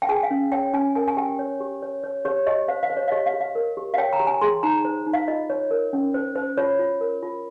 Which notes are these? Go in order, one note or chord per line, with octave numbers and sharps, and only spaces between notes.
G5
G#4 G#5
F5
C#4
C#5 G5
C#4 G#5
A#4 G#5
G#5
G4 G5
C#5
G4
C#5
C#5
G4 C#5
G4 D#5
C5 F5
F5
C5
C#5
F5
G4 D#5
F5
G4
F5
A#4
G4
F5
C#5 G5
A#5
G4
G#5
G#4 C6
D#4 A#5
C5
D#4
F5
F4 D#5
C#5
A#4
C#4
C5
C5
F4 C#5
F4
A#4
F4